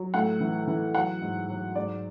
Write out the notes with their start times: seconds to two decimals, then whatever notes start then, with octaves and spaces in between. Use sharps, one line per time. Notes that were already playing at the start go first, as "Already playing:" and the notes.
Already playing: F#3
0.14 A2 F#5
0.40 E3
0.67 E3
0.95 F#3 F#5
1.21 G#2
1.49 F#3
1.75 G#2 D5